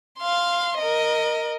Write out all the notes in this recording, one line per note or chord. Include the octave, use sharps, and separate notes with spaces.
F5 C6
A#4 D#5